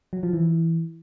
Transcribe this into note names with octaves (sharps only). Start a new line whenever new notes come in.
F#3
F3
E3